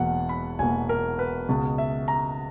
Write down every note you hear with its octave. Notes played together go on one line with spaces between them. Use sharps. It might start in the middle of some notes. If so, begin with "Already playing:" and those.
Already playing: E1 E2 B2 A#3 F#5
B5
E1 E2 B2 A#3 G#5
A#4
B4
C#2 B2 G#3
E5
A#5